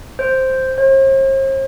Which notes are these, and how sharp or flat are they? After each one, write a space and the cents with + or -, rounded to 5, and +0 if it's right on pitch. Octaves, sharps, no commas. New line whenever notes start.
C5 +0
C5 +45